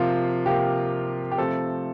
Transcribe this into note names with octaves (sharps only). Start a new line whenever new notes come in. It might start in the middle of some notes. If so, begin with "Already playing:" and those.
Already playing: C3 F3 A#3 F4
C3 F3 A#3 G4
G4
C3 F3 A3 C4 A4